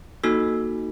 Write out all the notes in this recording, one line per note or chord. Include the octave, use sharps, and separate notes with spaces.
A#3 D#4 F#4 A4 E6